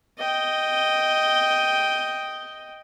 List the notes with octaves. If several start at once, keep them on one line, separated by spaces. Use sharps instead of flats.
D#5 G5